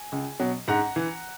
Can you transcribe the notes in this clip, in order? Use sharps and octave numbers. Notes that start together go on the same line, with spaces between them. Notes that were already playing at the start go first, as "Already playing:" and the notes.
Already playing: G#5
C#2
B2 F#3
G#2 F#5 A#5
E3